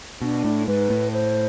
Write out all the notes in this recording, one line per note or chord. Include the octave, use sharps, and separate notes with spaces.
B2 D4
A2
G#2 B4
A2
C5